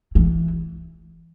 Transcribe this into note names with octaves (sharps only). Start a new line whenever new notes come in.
E3